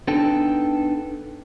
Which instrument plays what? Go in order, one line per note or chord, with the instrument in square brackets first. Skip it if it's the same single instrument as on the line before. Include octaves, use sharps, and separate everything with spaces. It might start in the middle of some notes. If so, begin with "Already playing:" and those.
[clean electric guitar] B3 D4 D#4 A4 B4 G5